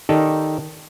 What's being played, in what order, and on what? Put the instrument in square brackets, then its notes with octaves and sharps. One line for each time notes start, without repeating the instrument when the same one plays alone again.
[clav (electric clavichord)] D#3 D#4 G4 A4 D5